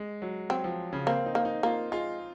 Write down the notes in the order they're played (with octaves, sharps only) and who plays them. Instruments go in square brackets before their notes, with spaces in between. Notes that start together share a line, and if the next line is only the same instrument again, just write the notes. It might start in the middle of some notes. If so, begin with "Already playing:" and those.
Already playing: [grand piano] G#3
F#3
[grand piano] F#3 [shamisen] C4
[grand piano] F3
C#3
[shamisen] A#3 [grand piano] C4
[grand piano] D#4
[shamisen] A#3
[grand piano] D#4
[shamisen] A#3 [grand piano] F4
[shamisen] G#3 [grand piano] F4